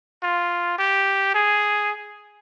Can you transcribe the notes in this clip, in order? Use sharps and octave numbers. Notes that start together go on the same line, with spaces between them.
F4
G4
G#4